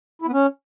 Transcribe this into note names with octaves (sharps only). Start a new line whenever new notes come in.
E4
B3
C#4